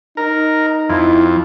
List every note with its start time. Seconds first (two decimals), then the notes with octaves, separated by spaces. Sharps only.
0.17 D#4 A#4
0.89 F2 E4